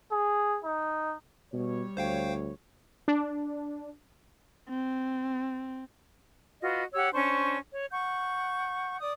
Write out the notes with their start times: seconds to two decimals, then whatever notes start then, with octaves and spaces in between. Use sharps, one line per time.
0.12 G#4
0.64 D#4
1.53 B2 G3 C#5
1.97 D2 C5 F5 G5
3.08 D4
4.70 C4
6.62 F4 F#4 B4 D#5
6.94 G4 C#5 F#5 E6
7.14 C#4 D4 C5 C#6
7.72 C#5
7.91 F#5 C#6 G6
9.01 D5 D#6